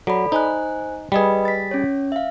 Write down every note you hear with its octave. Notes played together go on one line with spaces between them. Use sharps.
F#3 A4 D5 B5
D#4 C5 G#5 F#6
G3 G#4 B4 D#5 B5
A6 B6
C#4 C#5
E5 F5